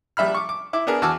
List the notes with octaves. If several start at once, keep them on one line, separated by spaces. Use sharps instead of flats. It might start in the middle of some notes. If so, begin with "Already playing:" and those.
A#1 G3 E5 B5 F6
C#6 D6
D6
E4 D6
B3 D4 G#4 A#4
E2 F#4 A5 D6 E6 F6